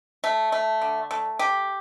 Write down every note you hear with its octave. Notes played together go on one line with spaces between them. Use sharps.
A3
A3
D3
A3
G4